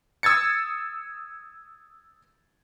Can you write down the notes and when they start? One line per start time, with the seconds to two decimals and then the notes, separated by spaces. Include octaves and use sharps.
0.23 D#6 E6 G#6 A6 C#7